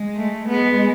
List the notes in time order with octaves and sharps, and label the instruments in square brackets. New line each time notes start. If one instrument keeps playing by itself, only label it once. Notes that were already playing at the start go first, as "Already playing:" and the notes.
Already playing: [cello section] G#3
[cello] A3
[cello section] G#3 [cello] B3